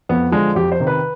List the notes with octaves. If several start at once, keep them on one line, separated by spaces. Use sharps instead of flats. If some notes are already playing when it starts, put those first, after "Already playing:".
F2 B3
D3 F3 G#3
F2 G4
C5
C3 D#3
B4